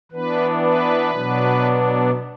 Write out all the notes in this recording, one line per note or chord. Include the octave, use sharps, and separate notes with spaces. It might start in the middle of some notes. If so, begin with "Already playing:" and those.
E3 B3 D4 B4
B4
B2 F#3 B3 D4